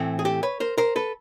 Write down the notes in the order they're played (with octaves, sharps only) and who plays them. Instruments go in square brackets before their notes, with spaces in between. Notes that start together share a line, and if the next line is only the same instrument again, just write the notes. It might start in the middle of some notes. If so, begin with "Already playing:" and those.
Already playing: [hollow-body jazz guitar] A2 E3 A3 C4
G#4
G4 A4
B4 C#5
A#4 C5
A#4 C5
A4 B4